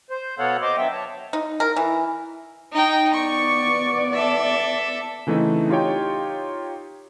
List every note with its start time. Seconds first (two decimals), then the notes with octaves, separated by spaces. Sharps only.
0.10 C5
0.39 B2 B3 A4 C#5 F5 F#5
0.62 C5 D#5 C6 D6
0.77 D3 F#3 B3 E5 G5
0.92 C#5 A5
1.33 D#4
1.60 A#4
1.76 E3
2.72 D#4 G5
3.13 B3 D5 C#6
4.14 A4 E5
5.27 C#3 E3 A3 C4 D#4
5.69 D#4 F4 G4 C#5 G5